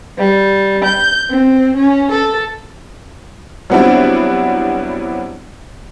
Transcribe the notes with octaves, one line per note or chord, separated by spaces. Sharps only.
G3
G6
C4
C#4
A4
F#3 G3 B3 C4 D4 E4